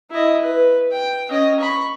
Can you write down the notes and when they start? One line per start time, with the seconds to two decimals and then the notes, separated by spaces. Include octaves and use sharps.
0.11 E4 D#5
0.42 B4
0.92 G5
1.30 C#4 D#5
1.60 B5 C#6